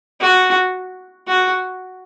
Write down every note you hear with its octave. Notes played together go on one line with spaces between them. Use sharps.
F#4
F#4